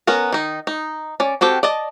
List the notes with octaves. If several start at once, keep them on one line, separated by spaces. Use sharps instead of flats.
B3 C#4 A#4
D#3 D#4
D#4
C#4 D5
C4 F#4 G4 A4
D5 D#5 A5